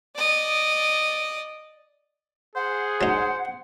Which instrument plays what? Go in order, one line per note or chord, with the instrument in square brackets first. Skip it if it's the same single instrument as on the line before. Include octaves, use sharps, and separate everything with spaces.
[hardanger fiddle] D5 D#5
[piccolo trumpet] G#4 [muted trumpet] C5 [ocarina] F#5
[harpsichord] F#3 D#4 [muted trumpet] C5